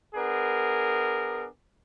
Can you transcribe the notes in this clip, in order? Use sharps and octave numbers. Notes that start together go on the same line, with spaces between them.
B3 D4 G#4 A#4